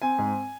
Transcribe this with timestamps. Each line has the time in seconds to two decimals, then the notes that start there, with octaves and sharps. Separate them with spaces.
0.02 C4 G#5
0.18 G#2